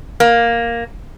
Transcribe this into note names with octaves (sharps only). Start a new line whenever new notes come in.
A#3